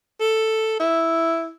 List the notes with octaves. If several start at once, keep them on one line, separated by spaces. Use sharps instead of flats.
A4
E4